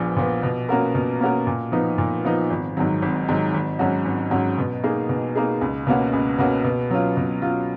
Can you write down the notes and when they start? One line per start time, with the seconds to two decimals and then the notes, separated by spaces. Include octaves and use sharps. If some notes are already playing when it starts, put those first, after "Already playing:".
Already playing: A#1 A#2 F3 B3
0.16 A#2 F3 B3
0.43 B2
0.69 A#3 C#4 F#4 A#4
0.95 B2
1.20 A#3 C#4 F#4 A#4
1.47 A#2
1.72 F3 B3 D#4
1.98 A#2
2.25 F3 B3 D#4
2.50 G#1
2.77 G#2 D#3 F#3
3.02 G#1
3.29 G#2 D#3 F#3
3.54 G#1
3.79 G#2 F#3 C#4 F#4
4.05 G#1
4.31 G#2 F#3 C#4 F#4
4.58 B2
4.83 A#3 D#4 G#4
5.09 B2
5.35 A#3 D#4 G#4
5.61 C#2
5.87 B2 A#3 C#4 F#4
6.13 C#2
6.38 B2 A#3 C#4 F#4
6.64 B2
6.90 F#3 C#4 F4
7.17 B2
7.42 F#3 C#4 F4